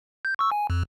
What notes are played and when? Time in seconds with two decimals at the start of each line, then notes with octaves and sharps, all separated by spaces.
0.25 G6
0.39 C#6 E6
0.51 G#5
0.70 F2